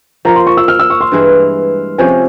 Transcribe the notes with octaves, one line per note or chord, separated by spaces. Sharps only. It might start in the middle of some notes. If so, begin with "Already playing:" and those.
F3 A#3 F4 A#5
C6
C#6
E6
F6
E6
C#6
C6
G2 E3 G#3 E4
C3 F3 G#3 C#4 G#5